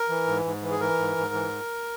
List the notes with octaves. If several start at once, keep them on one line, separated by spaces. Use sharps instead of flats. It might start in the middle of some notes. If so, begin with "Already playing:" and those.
Already playing: A#4
E3
G#2
G#2
E3
G#4
E3 A#4
G#2
G#2
E3